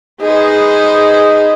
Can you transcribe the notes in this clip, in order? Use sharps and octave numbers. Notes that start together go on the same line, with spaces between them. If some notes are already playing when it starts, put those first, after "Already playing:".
D#4 G#4 B4 C5